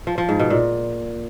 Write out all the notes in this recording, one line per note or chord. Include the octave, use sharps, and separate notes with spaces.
F3
F3
G#2
B2
A#2